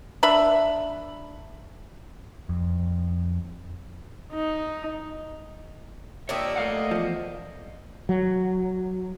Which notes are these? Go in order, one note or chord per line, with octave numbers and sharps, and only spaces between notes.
D4 E5 B5
F2
D#4
A#3 D4 F4 G4 C#5 D#5 E5
A3 D#5 F5 F#5
E2 F3
F#3